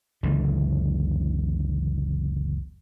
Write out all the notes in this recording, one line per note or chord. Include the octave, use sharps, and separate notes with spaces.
F#1 C#2 D3 E3